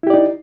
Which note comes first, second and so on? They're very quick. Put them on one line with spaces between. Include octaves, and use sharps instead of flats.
E4 G4 D5 D#4